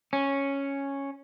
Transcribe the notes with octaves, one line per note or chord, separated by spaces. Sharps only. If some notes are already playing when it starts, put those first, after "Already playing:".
C#4